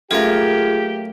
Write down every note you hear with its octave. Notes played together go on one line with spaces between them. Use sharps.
F#2 A3 A#3 F4 G4 G#4 A#5